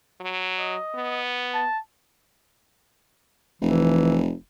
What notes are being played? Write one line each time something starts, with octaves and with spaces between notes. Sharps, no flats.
F#3
D#5
B3
A5
F1 E3